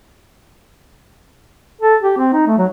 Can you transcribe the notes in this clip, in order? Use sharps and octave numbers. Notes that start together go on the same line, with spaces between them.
A4
G4
C4
D#4
A3
F#3